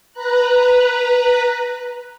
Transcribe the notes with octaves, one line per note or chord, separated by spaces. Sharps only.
B4 A#5 F#6